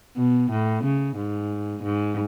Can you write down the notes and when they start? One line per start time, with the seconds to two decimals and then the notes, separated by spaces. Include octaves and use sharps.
0.17 B2
0.51 A2
0.84 C#3
1.16 G#2
1.83 G#2